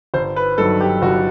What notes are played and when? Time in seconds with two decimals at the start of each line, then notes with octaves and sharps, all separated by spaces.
0.14 G1 C5
0.36 B4
0.58 G2 D#3 F#3 A4
0.81 G4
1.02 G1 F#4